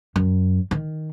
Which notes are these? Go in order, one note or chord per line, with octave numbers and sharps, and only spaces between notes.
F#2
D#3